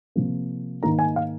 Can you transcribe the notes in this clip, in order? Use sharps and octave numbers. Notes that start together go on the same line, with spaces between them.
C3 F3 A#3
G#2 D#3 A#3 A#5
G#5
F5